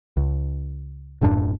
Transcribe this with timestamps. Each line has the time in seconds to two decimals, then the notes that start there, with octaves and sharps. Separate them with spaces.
0.17 C#2
1.21 D#1 F#2 A2 D4